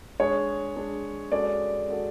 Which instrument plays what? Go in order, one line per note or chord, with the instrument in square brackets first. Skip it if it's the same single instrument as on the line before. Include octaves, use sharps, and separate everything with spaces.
[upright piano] G#3 D4 G#4 [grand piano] C#5
[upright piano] G#3 D4 G#4
[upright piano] G#3 C#4 F#4 A4 [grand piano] D5
[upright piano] G#3 C#4 F#4 A4